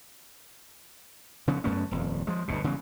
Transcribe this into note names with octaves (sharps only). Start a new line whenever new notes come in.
C#3 F3 B3
F#2 A3 B3 C#4
D#1 F2
F3 G#3
G1 D2 B2
C#3 E3 G3 B3